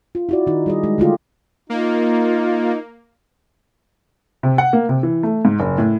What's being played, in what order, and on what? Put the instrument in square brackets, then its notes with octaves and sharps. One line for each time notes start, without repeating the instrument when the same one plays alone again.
[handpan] F4
E4 F#4 D5
D#3 D#4
G3 G#4 D#5
G#3
D3 A3 F4 G4
[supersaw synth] A#3 [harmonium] D#4 [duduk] F4
[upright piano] C3
F#5
A#3
C3
E3
A3
G#2
F#1
A2